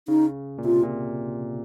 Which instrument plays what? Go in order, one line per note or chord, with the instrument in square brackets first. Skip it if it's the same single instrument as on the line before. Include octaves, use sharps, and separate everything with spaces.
[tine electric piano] C#3 [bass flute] D#4
[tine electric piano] A#2
[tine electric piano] C3 [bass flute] F4
[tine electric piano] A#2